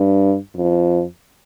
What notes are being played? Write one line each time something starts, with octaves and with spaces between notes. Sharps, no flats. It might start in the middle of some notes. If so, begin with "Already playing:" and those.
Already playing: G2
F2